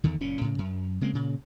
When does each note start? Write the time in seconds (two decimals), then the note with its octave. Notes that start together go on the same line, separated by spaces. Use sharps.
0.04 E2 D3 D#3
0.20 F#1 A#2 C#4
0.41 A2 C#3
0.58 F#2
1.01 C#3 G#3 A#3 C4
1.13 A#2 C#3